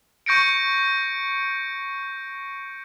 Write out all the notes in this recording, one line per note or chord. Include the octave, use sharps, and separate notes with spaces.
C#6 G6 A#6 C#7 D7